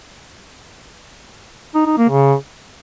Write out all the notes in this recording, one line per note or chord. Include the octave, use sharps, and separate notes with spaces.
D#4
D#4
A#3
C#3